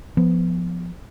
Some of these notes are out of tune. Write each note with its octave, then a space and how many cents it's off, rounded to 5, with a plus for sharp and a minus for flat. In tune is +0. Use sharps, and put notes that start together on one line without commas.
F3 +0 B3 +0